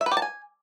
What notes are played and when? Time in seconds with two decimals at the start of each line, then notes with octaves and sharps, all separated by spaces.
0.01 E5
0.06 B4
0.11 G4
0.17 A5
0.22 G#5